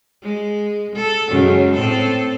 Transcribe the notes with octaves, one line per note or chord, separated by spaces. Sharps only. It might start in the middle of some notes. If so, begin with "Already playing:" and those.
G#3
A4
F#2 C#3 G#3
A2 C4 A4